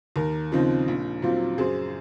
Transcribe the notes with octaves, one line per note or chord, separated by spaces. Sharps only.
D#2 A#4
C#3 F3 C4 D#4
A#1
A#2 F#3 C4 F4
F#2 G#4 C5